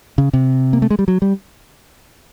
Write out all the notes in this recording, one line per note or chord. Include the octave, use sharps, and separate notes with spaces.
C#3
C3
A#3
A3
G#3
G3
F#3
G3